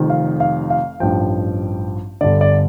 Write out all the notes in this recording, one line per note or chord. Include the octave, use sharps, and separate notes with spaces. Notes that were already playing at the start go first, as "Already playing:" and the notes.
Already playing: F1 F2 D#3
F5
F5
F5
A1 G2 F3 G5
G1 G2 D3 D5
D5